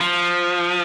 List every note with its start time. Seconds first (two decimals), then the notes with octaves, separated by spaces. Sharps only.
0.01 F3